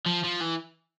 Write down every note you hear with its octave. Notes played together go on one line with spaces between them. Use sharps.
F3
F3
E3